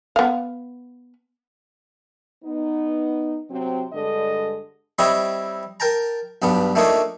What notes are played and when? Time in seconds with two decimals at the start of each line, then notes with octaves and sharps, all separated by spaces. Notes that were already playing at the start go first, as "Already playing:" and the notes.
0.16 B3 F5
2.44 B3 D#4
3.50 C3 F#3 C4
3.93 G2 D3 G#3 A4 D#5
4.99 G3 C4 E4 C#5 D#5
5.80 A#4 G5 A5 A#5
6.42 B1 G2 B3 D4
6.75 A3 A#3 D4 D#4 F4 C#5